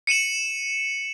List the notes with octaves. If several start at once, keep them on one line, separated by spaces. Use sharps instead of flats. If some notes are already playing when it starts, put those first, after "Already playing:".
C#7 D#7 E7 F#7